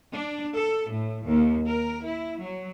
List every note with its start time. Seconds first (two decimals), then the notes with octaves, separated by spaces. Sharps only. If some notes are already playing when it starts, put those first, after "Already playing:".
0.13 D4
0.56 A4
0.90 A2
1.26 D#2
1.67 A#4
2.04 E4
2.40 F#3